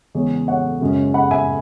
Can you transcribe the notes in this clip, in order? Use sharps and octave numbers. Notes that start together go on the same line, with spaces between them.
E2 C#3 G#3 C#4 G#4 C#5
C#5 F#5
F#2 C#3 G#3 C#4
F#5 B5
E5 G#5